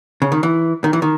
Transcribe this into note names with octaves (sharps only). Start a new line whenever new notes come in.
C#3
D#3
E3
D#3
E3
D#3